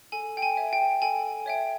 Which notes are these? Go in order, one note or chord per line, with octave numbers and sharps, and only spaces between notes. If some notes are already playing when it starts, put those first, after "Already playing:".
A4 G#5
G5
G#5
C#5 E5 G5
G5
A4 G#5
C#5 E5 G5